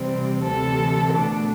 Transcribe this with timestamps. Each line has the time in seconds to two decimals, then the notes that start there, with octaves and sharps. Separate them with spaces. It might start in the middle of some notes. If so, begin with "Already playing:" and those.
Already playing: C3 E3 G3 C4
0.43 D2 C3 E3 A4
1.13 B2 A3 D4